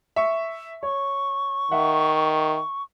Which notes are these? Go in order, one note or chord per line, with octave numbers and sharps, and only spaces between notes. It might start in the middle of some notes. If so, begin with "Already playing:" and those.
E5 C#6
C#5 C#6
D#3 E5 F#5